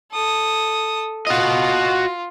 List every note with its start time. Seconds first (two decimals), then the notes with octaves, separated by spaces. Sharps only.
0.12 A4 D#6
1.27 F4 F#4 D#5